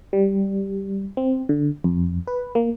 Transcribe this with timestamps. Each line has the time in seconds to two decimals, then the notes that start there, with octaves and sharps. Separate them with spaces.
0.13 G3
1.17 C4
1.49 D3
1.84 F2
2.27 B4
2.55 A#3